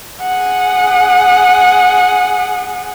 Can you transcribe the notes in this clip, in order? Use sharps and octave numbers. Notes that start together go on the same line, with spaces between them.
G#4 F#5